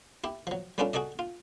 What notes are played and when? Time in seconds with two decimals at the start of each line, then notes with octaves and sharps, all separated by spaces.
0.24 E4 G4
0.47 F3 F#3
0.78 G3 B3 C#4 D4 F4 A4
0.93 F#4 G#4 A4 D5 D#5
1.19 F4